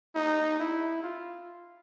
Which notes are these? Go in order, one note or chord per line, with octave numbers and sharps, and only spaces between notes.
D#4
E4
F4